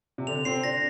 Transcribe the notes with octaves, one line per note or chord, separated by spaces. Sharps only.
C3
D3 F7
C4 C7
D4 A#6